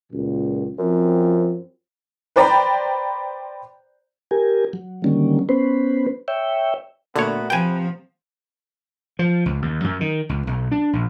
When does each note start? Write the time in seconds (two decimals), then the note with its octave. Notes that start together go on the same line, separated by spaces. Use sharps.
0.12 C#2 F#2 A#2
0.78 F#2 F3 C4
2.36 B4 C5 D5 G5 A#5 B5
4.31 G4 A#4 G#5
4.73 F#3
5.04 D3 D#3 F#3 G3 A#3 C#4
5.49 B3 C#4 B4 C5
6.28 C#5 E5 G5
7.16 A#2 D3 A3 B3 F#4 C#5
7.50 C3 F3 C4 B4 G5 G#5
9.19 F3
9.46 C#2
9.62 D#2
9.84 F#2
10.01 D#3
10.29 C#2
10.47 B1
10.71 D4
10.93 A#1